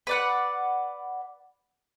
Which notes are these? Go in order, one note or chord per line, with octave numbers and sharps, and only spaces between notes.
B4 D5 F#5